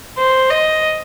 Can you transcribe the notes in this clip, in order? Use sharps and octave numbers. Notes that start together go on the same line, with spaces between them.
C5
D#5